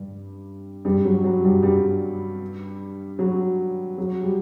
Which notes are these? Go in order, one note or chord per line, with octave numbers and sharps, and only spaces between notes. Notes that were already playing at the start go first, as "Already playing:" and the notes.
Already playing: G2 G3
G2 G3
F#3
F#3
G2 G3
G2 G3
F#3
F#3
G3